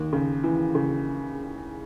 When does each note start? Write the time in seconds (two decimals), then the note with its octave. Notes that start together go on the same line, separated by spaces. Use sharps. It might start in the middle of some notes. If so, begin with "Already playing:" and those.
Already playing: D#2
0.13 C#3
0.43 E3
0.75 C#3